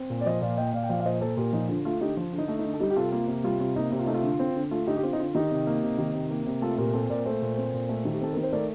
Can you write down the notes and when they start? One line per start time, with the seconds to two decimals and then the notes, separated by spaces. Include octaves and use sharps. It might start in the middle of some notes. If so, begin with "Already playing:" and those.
Already playing: C4
0.10 A#2
0.21 D5
0.25 F3 C5 D#5
0.41 A#2 D5 F5
0.57 A#3 D#5 G5
0.73 A#2 D5 F5
0.83 G5
0.89 F3 D5 F5
1.00 F5
1.05 A#2 C5 D#5
1.21 A#3 A4 C5
1.37 A#2 G4 A#4
1.53 F3 D#4
1.68 D3 F4
1.85 A3 F4
2.01 D3 D#4 G4
2.17 F3 F4
2.33 D3
2.38 D#4
2.48 A3
2.59 D#4
2.65 D3
2.74 A4
2.80 G3 D#4 G4
2.90 G4
2.96 C3 F4 A4
3.12 A#3 F4
3.27 C3
3.44 G3 F4
3.60 C3 F4
3.76 A#3 D#4
3.91 C3 G4
3.99 F4
4.06 A3 D#4
4.14 F4
4.23 D3
4.39 C4
4.55 D3
4.71 A3 F4
4.87 D3 D#4 G4
4.97 G4
5.03 C4 F4
5.13 D#4
5.19 D3 F4
5.35 D#3 D#4 G4
5.51 C3
5.67 A#3
5.83 C3
5.98 D#3
6.14 C3
6.31 A#3
6.46 C3
6.61 A3 F4 A4
6.78 A#2 G4 A#4
6.93 C4 A4 C5
7.09 A#2 A#4 D5
7.26 A3 A4 C5
7.42 A#2
7.57 C4
7.74 A#2
7.89 A3
8.05 D#3
8.13 G4
8.21 C4 A4
8.33 D#3 A#4
8.43 C5
8.52 A3 A#4 D5